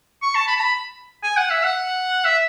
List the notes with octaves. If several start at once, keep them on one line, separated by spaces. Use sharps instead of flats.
C#6
A5
B5
A5
B5
G#5
F#5
E5
F#5
E5